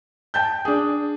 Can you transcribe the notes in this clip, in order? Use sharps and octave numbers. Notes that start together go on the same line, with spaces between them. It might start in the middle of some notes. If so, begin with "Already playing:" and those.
G5 A5 G6
D4 G#4